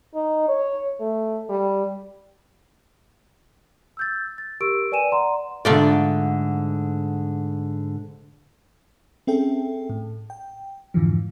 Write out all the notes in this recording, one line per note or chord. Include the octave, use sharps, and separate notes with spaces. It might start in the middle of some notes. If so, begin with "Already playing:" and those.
D#4
C#5
A3
G3
E6 G6 A6
A6
G4 A#4 C#6 E6 D7
B4 D5 G5 G#5 D#7 E7
D5 F#5 A#5 C6
G#2 D3 A3 F4 D5
C4 C#4 G#4 A4 E5 G5
A2
G5
F2 G#2 D3 E3 F3